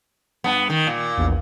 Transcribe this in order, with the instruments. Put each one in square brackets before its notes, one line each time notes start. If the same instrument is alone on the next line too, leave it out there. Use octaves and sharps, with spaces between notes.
[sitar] G2 B3
D#3
A#2
[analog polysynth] A#1 E2